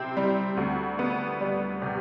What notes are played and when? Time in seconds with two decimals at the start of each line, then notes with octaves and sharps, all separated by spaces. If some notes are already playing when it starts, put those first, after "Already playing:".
Already playing: C3 C4 E4
0.17 G3
0.57 D2
0.99 B3
1.41 G3
1.82 C3